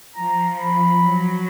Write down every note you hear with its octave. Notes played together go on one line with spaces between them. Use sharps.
F3 A#5
B5
F#3